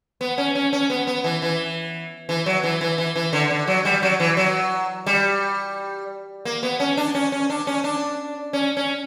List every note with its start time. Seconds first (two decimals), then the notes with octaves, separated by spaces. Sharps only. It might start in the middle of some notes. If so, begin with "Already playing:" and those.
0.21 B3
0.38 C#4
0.55 C#4
0.73 C#4
0.90 B3
1.07 B3
1.24 E3
1.42 E3
2.29 E3
2.46 F#3
2.64 E3
2.81 E3
2.98 E3
3.16 E3
3.33 D3
3.50 D3
3.67 F#3
3.85 G3
4.03 F#3
4.20 E3
4.37 F#3
5.06 G3
6.45 A#3
6.63 B3
6.80 C#4
6.97 D4
7.15 C#4
7.32 C#4
7.50 D4
7.67 C#4
7.84 D4
8.53 C#4
8.77 C#4